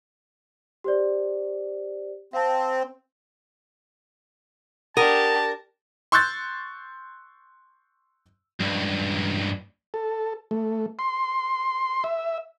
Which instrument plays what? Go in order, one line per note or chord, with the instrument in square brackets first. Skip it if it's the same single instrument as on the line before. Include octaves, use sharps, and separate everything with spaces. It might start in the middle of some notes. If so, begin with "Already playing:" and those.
[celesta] G4 C5 D5
[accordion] C4 [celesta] F5 A5
[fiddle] D4 G4 [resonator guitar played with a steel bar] A#4 [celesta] F#5 D#6 D#7 [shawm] A5
[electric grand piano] C6 C#6 E6 F#6 G6 A6
[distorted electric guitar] C#2 G2
[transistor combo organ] A4
A3
C6
E5